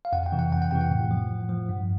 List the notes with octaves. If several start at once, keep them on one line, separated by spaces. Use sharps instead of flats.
F5
F2 F#5
G5
C3 E3
F#5
F2 G5
F#5
C3 E3 G5
F#5
A2
F3
A2
F3
G2